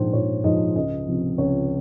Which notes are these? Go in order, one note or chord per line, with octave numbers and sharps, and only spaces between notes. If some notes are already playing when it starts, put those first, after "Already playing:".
Already playing: A#1 G#2 F3 C5
A#1 C#5
G#2 F3 D#5
C#2 D#5
C3 F3
C#2 C#5